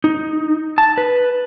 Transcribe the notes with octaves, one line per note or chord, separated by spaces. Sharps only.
D#4
A5
B4